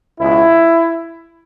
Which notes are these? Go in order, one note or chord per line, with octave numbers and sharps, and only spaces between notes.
C#2 B2 G#3 E4